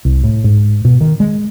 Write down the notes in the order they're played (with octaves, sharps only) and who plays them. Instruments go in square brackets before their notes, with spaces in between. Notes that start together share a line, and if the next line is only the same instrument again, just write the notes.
[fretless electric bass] C2
A2
G#2
B2
D#3
G#3